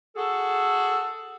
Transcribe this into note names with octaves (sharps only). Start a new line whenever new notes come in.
F#4 G#4 A4